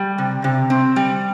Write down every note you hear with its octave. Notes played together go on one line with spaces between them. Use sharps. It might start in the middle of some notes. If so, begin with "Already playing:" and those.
Already playing: G3
C3
C3
C4
G3